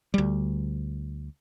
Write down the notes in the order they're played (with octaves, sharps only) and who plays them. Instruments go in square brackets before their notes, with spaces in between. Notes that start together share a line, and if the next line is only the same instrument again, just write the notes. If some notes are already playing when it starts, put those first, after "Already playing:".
[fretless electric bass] D2 G3